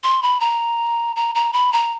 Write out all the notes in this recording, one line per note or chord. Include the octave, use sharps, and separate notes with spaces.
C6
B5
A#5
A#5
A#5
B5
A#5